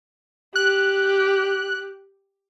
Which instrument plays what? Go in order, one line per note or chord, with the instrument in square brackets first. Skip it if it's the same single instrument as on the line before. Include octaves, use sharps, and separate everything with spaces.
[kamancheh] G4 [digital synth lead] F#6